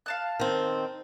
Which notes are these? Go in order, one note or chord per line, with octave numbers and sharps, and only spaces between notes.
F5 A5 F#6
D#3 C4